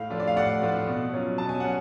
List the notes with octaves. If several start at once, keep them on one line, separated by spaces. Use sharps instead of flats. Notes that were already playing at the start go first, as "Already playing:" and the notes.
Already playing: A2 F5
F3 A3 D4 F4
D5
F5
A2 D5 F#5
F3 A3 D4 F4
B2
F#3 C#4 F4
B2 A5
G#5
F#3 C#4 F#5